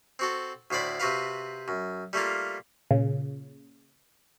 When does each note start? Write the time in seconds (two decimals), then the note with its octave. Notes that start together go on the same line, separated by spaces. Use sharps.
0.19 C4 F#4 A4
0.71 D2 A2 C5 D5 B5
1.00 C3 C4 F#4 B4 F5
1.68 F#2
2.13 G3 A3 A#3 F4
2.91 A#2 C#3